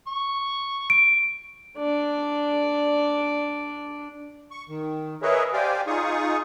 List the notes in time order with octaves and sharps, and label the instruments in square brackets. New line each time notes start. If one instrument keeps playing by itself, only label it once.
[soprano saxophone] C#6
[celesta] D7
[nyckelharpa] D4 D5
[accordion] C#6
D#3
G#4 A#4 B4 C#5 D#5 E5
G4 C5 D5 F5 G5 G#5
D#4 F4 G#4 C#6 D#6